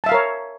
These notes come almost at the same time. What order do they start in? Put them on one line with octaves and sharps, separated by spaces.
A5 E5 F5 A#4 C#5